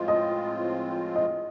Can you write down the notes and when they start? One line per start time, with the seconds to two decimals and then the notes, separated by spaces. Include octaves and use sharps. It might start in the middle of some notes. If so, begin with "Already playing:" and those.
Already playing: A2 F3 G#3 C4 F4
0.08 D#5
1.16 D#5